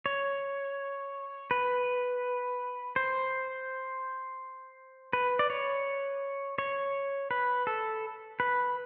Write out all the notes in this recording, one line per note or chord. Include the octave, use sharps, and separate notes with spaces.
C#5
B4
C5
B4
D5
C#5
C#5
B4
A4
B4